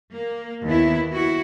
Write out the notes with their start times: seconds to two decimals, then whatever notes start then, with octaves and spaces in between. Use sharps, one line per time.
0.12 A#3
0.64 D#2 B3 E4
1.12 E4 F#4